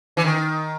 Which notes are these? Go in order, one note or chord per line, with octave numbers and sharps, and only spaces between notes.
E3
D#3